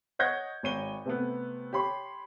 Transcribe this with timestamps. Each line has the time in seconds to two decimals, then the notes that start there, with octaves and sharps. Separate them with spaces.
0.19 C#5 D#5 F#5 G6 G#6 A#6
0.63 G#1 C#5 D#7 G7
1.05 C3 A3 B3
1.73 G4 C#5 B5 C6